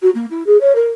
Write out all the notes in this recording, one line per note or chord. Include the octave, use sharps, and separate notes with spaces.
F#4
A#3
E4
G#4
C#5
A#4